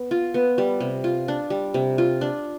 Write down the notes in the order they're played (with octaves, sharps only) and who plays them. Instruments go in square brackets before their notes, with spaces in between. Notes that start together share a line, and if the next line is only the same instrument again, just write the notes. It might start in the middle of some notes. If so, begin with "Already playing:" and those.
Already playing: [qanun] B3
F4
B3
G3
C3
F4
D4
G3
C3
F4
D4